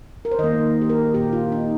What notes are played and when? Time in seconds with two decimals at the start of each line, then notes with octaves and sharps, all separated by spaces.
0.25 A#4
0.32 C5
0.39 D#3 D#5
0.44 A#3
0.82 G4
0.89 A#4
1.14 A#2 A#3 G4
1.33 F4
1.52 D#4